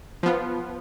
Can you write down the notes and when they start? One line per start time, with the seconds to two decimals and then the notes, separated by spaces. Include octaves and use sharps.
0.23 F3 B3 F4